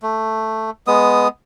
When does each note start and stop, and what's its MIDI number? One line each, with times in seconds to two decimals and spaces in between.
0.02 0.70 57
0.87 1.28 56
0.87 1.28 59
0.87 1.28 87